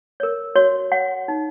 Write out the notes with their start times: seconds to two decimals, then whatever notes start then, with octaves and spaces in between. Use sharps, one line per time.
0.20 A#4 C#5
0.56 F#4 C#5
0.92 C#5 F#5
1.28 D#4